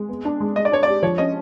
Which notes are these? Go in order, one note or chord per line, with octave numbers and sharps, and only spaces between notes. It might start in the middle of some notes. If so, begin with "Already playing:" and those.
Already playing: G#3
B3
D4
G#3
G#3 D#5
D5
D4 C#5
G4 D5
F3 C#5
C#4 D#5